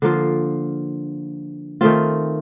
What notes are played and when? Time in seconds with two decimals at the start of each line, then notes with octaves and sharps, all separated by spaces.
0.02 D3 F3 A#3 F4
1.81 D#3 A3 C4 F4